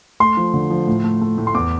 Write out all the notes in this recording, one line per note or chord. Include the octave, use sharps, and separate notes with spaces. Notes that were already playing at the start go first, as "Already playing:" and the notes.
A3 C6
F3
D3
F3
A2
A3
A3
A2
C6
E2 D6